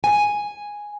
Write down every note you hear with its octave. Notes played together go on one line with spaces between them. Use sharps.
G#5